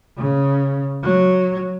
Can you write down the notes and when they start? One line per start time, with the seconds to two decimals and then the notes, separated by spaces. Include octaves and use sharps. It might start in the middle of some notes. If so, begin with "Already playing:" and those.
0.17 C#3
1.03 F#3